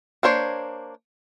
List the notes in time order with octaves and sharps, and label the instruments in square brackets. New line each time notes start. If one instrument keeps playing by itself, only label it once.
[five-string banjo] A#3 D4 C5 C#5